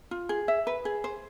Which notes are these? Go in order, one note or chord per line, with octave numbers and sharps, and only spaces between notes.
F4
G#4
E5
B4
G#4
C5